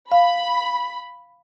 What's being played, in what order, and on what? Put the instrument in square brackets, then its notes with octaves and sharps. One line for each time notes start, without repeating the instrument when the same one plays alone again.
[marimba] F5 [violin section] B5